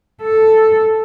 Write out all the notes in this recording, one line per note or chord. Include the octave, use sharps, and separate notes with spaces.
A4